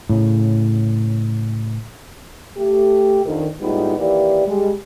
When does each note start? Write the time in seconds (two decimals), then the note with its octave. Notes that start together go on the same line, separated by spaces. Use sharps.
0.10 A2 C#3
2.57 A3 G4
3.24 F2 D3 D#3
3.61 A2 G3 G#3 B3 D#4 F4
3.97 D#2 E3 A#3 E4 G4 D5
4.47 G3 G#3